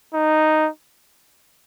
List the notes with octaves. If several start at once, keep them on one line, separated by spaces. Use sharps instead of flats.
D#4